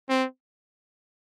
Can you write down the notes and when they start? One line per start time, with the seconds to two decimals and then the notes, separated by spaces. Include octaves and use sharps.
0.09 C4